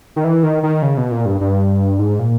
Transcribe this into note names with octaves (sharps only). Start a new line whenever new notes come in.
D#3
E3
D#3
D#3
C#3
B2
A#2
G2
G2
G#2
A#2